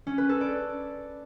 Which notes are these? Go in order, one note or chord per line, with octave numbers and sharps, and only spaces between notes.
C#4
B4
A4
D5